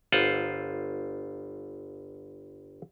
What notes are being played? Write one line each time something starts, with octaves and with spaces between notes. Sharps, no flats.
G1 F4 C5 F#5